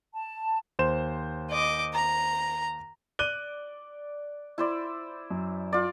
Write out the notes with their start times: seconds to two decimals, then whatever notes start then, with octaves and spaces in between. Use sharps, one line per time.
0.14 A5
0.79 D#2 C5 E7
1.51 D#5 D6
1.94 A#5
3.19 D5 F#6 D#7 G7
4.58 E4 C5 D5
5.31 F#2
5.72 F4 D5